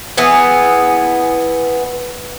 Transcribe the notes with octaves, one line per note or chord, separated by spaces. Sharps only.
E3 B3 G#4